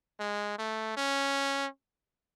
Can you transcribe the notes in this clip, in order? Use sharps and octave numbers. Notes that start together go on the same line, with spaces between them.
G#3
A3
C#4